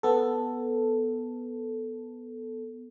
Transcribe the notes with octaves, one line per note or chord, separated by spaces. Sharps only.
B3 A4